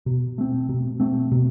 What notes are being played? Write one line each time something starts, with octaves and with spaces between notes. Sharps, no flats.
B2
A3 C4
B2
A3 C4
B2